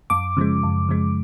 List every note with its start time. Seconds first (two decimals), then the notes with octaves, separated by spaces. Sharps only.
0.10 F#2 D6
0.37 C#3 F3 G#3
0.63 F#2
0.89 C#3 F3 G#3